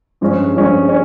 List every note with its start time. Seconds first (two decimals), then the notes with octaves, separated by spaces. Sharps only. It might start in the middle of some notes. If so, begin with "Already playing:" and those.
0.21 G2 F3 G#3 C#4
0.55 G2 F3 G#3 C#4
0.89 C#4